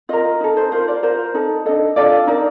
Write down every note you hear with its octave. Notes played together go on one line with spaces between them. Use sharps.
F4 A#4 D#5
D#4 A4
C5
F4 A#4 C5
D5
F4 A#4 C5
D#4 A4
D4 A4 D#5
D4 F4 A4 D5
D#4 A#4 D5